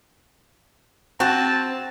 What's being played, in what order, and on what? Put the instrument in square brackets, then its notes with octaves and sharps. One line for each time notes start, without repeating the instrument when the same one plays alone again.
[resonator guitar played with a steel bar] C4 [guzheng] F#4 [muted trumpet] A5